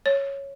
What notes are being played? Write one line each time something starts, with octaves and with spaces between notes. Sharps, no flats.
C#5